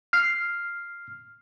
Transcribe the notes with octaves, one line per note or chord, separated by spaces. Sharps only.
F6 C7